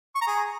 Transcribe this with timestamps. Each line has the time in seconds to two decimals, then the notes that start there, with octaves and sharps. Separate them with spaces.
0.15 C#6
0.21 A#5
0.27 G#4